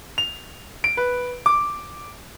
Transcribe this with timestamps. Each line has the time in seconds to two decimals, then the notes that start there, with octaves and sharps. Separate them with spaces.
0.18 F7
0.84 D7
0.97 B4
1.46 D6